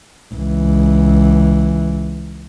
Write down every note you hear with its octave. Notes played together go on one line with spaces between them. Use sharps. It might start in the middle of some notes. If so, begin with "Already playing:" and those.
C#2 E3